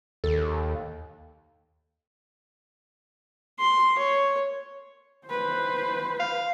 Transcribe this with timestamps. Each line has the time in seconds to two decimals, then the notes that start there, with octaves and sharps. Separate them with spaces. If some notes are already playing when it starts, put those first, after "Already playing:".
0.24 D#2 A4
3.60 C6
3.99 C#5
5.27 B4 C5
6.19 F5